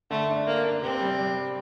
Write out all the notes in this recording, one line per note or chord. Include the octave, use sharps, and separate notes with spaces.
D3 A3
D4
A#3 D4
D4
C3 C4
G3
G3